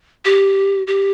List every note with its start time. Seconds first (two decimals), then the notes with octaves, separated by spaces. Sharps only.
0.25 G4
0.87 G4